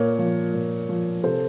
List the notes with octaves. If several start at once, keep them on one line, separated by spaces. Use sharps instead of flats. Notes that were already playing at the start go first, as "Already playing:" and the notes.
Already playing: A#2 A#4 C#5
F3
A#2
F3
C3 A4 C5